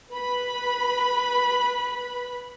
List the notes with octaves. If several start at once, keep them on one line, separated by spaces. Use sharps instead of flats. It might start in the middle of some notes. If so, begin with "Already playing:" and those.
B4 B5